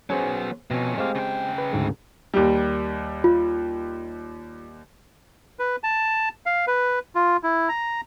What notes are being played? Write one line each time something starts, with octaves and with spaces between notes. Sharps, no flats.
F#3 B3 C#4 G#4 C5
F2 B2 C#4
G#3 A3 C4 G4 F5
C#3 G5
B4
D2 G#2
D#2 G3
F4
B4
A5
F5
B4
F4
E4
A#5